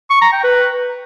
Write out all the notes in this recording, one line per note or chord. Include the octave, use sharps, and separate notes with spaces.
C#6
A#5
G5
B4